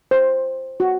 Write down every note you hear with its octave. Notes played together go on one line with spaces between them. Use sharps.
C5
F#4